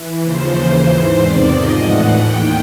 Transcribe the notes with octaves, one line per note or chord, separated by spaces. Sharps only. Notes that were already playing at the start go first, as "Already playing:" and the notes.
Already playing: E3
D#2 C#3 F3 C5
D#2 C#3 E3
G#2 E3
E2 C3 D#3 D5
G#2 F3 D#5
A2 E3 F#5
D#2 D#3 G5